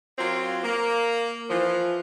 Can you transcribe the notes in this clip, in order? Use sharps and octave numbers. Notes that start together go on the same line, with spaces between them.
F#3 A#3 C4 F4
A#3
E3 F3